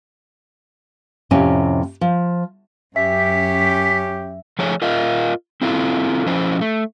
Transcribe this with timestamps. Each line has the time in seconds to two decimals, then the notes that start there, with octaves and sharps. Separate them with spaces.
1.31 F2 A2 C3 C#4 G#5
2.01 F3
2.96 F#2 C#4 G4 E5 B6
4.59 F3 A3 G#4 C#5
4.82 F4 A#4 D#5 F5
5.61 C4 E4 F4 A4
6.26 F3 C#4 E4 C5
6.61 A3